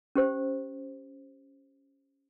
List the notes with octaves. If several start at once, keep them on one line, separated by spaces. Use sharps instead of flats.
C#4 G4 C5